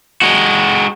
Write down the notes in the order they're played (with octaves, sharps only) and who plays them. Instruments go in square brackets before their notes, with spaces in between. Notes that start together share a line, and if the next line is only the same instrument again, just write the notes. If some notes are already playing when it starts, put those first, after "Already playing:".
[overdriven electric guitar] G#3 F#4